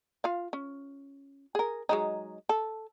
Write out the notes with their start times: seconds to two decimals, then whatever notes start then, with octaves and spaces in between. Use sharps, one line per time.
0.24 F4 F5
0.53 C#4
1.55 G#4 A#4
1.89 F#3 G#3 D#4
2.49 A4